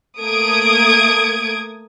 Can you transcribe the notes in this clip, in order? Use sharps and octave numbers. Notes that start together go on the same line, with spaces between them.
A3 A#3 D#6 G#6 D7